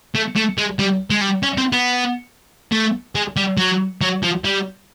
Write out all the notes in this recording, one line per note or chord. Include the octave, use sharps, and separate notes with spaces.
A3
A3
G#3
G3
G#3
G3
C#4
C4
B3
A3
G#3
G3
F#3
F#3
F3
G3